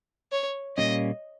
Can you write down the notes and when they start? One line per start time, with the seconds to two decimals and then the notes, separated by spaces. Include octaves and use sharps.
0.32 C#5
0.77 A#2 G3 A#3 C#4 D#5